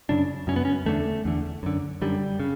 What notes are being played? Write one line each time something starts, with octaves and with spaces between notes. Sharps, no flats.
F#2 C#3 D4
F#2 C#3 C#4
B3
C#4
E2 D3 A3
E2 D3
F#2 D3
F#2 D3 G3
C#3